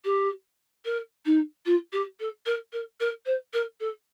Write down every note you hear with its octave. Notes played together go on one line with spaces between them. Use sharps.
G4
A#4
D#4
F4
G4
A4
A#4
A#4
A#4
C5
A#4
A4